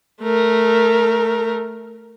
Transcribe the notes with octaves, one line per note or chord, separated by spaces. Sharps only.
A3 A#4